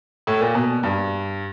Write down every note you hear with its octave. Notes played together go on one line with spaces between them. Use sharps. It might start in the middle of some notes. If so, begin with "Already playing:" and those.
A2
A#2
B2
G2